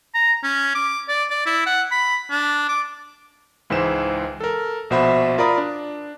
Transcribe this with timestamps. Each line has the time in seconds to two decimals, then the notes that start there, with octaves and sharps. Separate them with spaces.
0.14 A#5
0.44 C#4
0.75 D6
1.08 D5
1.30 D5
1.46 E4
1.67 F#5
1.91 B5
2.30 D4
2.68 D6
3.70 C#2 G#2 E3 C5 E7
4.40 A4 A#4
4.90 A#1 B2 C5 E5 F#5 B5
5.38 F4 A#4 D5 A#5 B5 D#6
5.58 D4